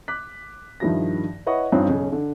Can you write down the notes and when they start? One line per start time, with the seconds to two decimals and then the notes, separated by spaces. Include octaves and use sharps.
0.08 D6 F#6 B6
0.80 G2 D#3 F3 E4 G4 A#6
1.46 E4 B4 C#5 D#5 F#5 C#6
1.72 G2 C4 C#4 D#4 F4
1.87 B1 C#3 C#4
2.12 D3